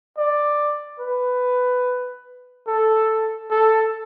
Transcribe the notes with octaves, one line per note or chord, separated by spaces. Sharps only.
D5
B4
A4
A4